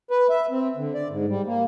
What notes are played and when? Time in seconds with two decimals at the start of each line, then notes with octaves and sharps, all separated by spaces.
0.11 B4
0.30 E5
0.50 C4
0.77 D3
0.94 D5
1.10 G#2
1.29 G3
1.46 A#3